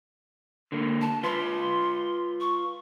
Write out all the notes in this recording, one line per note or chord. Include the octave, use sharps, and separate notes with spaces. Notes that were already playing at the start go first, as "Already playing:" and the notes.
D3 A#3
A5
F4 B4 C6
C#6